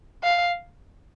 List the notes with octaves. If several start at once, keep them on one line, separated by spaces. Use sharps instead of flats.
F5